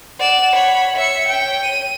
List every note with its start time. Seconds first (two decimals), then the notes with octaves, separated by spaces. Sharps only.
0.20 D5 F#5 E7
0.55 C#5 B5
0.96 C#5 E5 C#7
1.28 G5
1.63 D#7